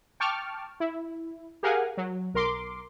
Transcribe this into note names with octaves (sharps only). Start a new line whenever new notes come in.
G5 A5 C#6 D6 F6
E4
G4 G#4 A#4 F5 F#5 G#5
F#3
B1 A#4 C6 D6